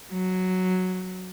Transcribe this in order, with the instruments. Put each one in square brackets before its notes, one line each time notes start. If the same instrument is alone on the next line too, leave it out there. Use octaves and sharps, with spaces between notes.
[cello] F#3